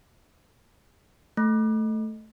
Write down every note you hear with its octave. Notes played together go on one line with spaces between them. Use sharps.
A3